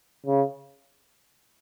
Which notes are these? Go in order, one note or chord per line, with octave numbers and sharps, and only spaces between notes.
C#3